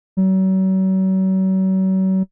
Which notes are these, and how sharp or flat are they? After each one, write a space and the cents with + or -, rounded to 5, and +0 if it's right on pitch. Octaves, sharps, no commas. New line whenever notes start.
F#3 +40